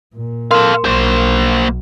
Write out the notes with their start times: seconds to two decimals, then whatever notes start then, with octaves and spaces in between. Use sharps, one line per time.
0.15 A#2
0.51 A4 A#4 F5 C6
0.85 B1 A#3 C5